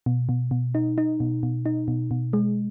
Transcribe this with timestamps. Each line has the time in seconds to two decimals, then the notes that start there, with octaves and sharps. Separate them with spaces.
0.06 B2
0.29 B2
0.51 B2
0.75 D#4
0.98 D#4
1.20 B2
1.43 B2
1.66 D#4
1.88 B2
2.11 B2
2.33 G#3